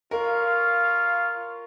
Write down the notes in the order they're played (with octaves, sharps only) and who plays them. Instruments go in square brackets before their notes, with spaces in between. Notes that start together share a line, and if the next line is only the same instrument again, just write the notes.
[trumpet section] F4 C#5 F5 [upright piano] A#4